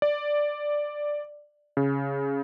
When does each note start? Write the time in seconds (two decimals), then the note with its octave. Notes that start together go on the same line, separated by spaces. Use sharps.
0.02 D5
1.77 C#3